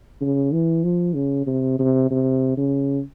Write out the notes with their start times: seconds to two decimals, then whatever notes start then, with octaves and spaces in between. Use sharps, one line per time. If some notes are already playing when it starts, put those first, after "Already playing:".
0.21 C#3
0.53 E3
0.84 F3
1.15 C#3
1.47 C3
1.79 C3
2.11 C3
2.57 C#3